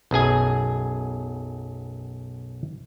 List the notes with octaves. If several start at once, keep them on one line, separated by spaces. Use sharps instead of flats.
B1 F#2 G#4 G#5